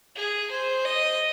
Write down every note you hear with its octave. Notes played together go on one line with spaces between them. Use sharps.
G#4
C5
D#5